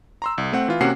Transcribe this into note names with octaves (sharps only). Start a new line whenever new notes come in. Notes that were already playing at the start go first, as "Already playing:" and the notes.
A#5 C6 E6
C2
A3 C4 F#5
E3 F4
C3 A#3 C#4 F#4 F#5 C7